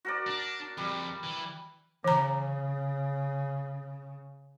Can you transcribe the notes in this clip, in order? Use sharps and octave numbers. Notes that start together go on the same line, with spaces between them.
F#4 A#4 D5
D4
F2 G3
E3
C#3 E3 A#5